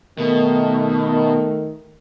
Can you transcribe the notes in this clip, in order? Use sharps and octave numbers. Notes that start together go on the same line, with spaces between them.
B2 D#3 A3